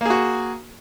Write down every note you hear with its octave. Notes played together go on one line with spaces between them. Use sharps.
A#3 F#4 G#4